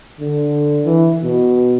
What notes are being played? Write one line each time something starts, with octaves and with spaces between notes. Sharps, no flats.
D3
E3
B2